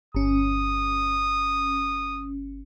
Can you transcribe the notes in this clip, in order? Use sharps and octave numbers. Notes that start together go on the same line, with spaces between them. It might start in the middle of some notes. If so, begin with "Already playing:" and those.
G1 C#4 D#6